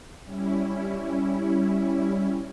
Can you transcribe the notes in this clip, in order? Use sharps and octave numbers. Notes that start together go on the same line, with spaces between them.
G3 C#4 E4